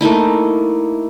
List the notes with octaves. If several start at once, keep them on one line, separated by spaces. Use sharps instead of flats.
A3 A#3 D#4 E4